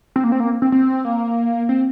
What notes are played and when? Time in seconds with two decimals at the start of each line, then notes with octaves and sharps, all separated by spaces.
0.16 C4
0.24 A#3
0.32 C4
0.40 A#3
0.62 C4
0.72 C4
1.05 A#3
1.69 C4